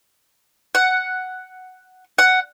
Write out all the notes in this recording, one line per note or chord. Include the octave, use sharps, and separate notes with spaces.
F#5
F#5